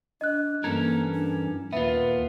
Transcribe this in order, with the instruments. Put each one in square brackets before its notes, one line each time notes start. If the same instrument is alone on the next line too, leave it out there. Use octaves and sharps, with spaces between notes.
[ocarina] D4 [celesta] D#5 F#6
[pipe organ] G2 E3 [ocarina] A#3 [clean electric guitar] C#4 A4 A#4 [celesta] G#6
[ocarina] D4
[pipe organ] D#2 A#2 [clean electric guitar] B3 F4 [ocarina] B4 [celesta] E5